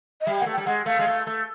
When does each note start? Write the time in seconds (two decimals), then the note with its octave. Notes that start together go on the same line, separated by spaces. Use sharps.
0.21 D#5
0.27 G3 E5
0.40 A#3 F#5
0.46 A3
0.53 G5
0.58 G3
0.66 G#3 F#5
0.86 A3 F5
0.99 G#3
1.07 A3
1.27 A3